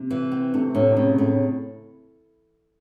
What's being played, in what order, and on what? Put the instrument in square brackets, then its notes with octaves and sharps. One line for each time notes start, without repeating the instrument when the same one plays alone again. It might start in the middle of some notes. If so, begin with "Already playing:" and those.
Already playing: [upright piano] C3
[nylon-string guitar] E3
C4
[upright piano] C3 [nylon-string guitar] A3
[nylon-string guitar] A2 [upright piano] C3
[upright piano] C3
[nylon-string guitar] A2 [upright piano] C#3
[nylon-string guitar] A2 [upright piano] C3
[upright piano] C#3